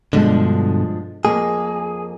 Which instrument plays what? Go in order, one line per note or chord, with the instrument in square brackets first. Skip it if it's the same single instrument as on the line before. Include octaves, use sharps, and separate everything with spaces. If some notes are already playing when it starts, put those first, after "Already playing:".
[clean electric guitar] G2 B2 D3 [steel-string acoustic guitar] F3 G#3 D4
[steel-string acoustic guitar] F2 A#3 [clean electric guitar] G#4